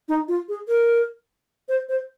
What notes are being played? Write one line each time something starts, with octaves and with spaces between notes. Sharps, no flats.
D#4
F4
G#4
A#4
C5
C5